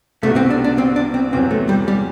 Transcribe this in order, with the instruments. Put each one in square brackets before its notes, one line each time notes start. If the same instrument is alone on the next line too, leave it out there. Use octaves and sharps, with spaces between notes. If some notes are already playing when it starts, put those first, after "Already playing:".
[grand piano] C2 B2 G3 B3 F#4 [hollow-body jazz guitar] A3
[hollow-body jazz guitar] C4
D4
D4
C4
D4
C4
[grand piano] E2 C3 F#3 [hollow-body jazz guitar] C4
[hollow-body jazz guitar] A3
G3
G3